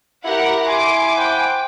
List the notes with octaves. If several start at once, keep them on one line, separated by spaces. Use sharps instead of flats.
E4 G4 A#4 F#5
G#5 C6 D6
C5 F#5 G5